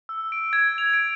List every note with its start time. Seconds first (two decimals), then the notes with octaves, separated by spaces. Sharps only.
0.09 E6
0.32 D7
0.53 G#6
0.78 F7
0.93 D7